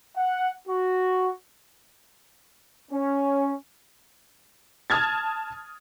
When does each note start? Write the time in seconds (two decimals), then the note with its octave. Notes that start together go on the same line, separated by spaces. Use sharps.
0.16 F#5
0.68 F#4
2.92 C#4
4.90 A5 D#6 F6 G#6 A6